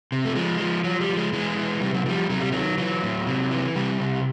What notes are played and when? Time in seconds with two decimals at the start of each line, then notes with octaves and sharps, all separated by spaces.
0.12 C3
0.25 A3
0.35 F3 G#3
0.60 F3
0.84 F3 F#3
1.00 G3
1.09 F3
1.17 G#3
1.33 E3 G#3
1.57 E3
1.81 C3 G3
1.94 F#3
2.06 F3 G3
2.30 C3 F#3
2.41 G3
2.52 D#3 F#3
2.78 E3 F#3
3.03 A2
3.27 C3
3.51 E3
3.75 C3 G3
4.00 C3